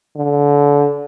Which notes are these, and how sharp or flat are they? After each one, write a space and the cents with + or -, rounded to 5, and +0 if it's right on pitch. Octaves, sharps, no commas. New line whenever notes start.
D3 -30